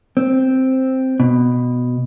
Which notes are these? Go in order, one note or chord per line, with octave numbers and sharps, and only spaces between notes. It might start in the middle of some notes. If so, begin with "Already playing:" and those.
C4
B2